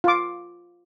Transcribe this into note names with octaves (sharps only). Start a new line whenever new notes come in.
F4 D6